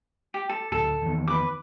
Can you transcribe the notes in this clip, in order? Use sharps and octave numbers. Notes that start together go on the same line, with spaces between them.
G4
A4
D1 D2 A4
E2 D#3
B4 D6